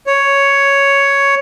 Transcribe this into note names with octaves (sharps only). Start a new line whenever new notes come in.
C#5